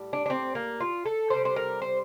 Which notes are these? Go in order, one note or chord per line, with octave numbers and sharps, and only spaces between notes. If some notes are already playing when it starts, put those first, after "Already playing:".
Already playing: A2 G3
D4
D4
C4
A#3
F4
A4
C3 G3 C5
C5
A#4
C5